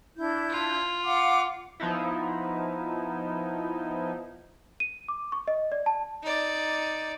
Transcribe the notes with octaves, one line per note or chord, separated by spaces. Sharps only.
D4 E4 G6
F4
F5 F#5 D6
F3 B3 D#4 E4
D#7
D6
C#6
D#5
D5
A5
D#4 D5